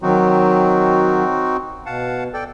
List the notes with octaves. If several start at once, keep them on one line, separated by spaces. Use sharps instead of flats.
D#3 F#3 C4 D#4 F#4
B2 F5 F#5 A5
A4 D5 G5